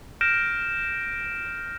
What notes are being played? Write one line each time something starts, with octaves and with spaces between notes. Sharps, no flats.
F6 G6 A#6 D7 E7